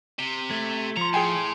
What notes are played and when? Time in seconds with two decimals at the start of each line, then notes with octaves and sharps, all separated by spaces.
0.19 C3 B6 G7
0.51 A3 G#6
0.97 F3 A#5 C6 C#7
1.14 A2 G#4 G5 G#5 C7 D7